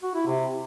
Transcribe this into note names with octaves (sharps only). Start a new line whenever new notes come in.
F#4
E4
C3